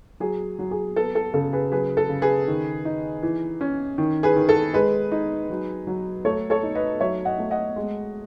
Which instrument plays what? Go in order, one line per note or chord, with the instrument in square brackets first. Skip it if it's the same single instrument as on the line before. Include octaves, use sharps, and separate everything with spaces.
[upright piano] F#3 G#4
F#3
G#4
B3 A4
A4
C#3 A4
G#4 B4
F#3 G#4 B4
A4
C#3
G#4 B4
D#3
D#4
E3
C#4
D#3
G#4 B4
D#3
A4
G#3 G#4 B4
D#4
F#3
F#3
A3 A4 C#5
A4 C#5
D#4
B4 D#5
F#3 C#5 E5
D#5 F#5
A3
D#5 F#5
G#3